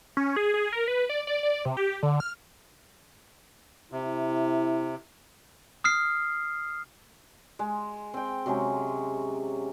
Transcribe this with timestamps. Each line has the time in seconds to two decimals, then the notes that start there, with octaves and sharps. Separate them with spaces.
0.17 C#4
0.36 G#4
0.54 G#4
0.73 A#4
0.88 B4
1.09 D5
1.27 D5
1.43 D5
1.65 C3
1.77 G4
2.03 D3
2.20 F6
3.92 C3 E4
5.84 D#6 F6 C7
7.59 G#3
8.14 C4 G5
8.46 C3 F#3 G#3 C#4